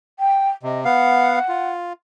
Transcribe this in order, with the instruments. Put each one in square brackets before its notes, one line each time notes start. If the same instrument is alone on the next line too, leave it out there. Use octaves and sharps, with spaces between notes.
[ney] G5
[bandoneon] C3 [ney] D#5
[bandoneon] B3 F5 [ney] F#5
[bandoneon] F4